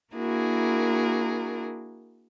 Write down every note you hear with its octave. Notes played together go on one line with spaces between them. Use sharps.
A#3 D4 E4 F#4 G#4 A#4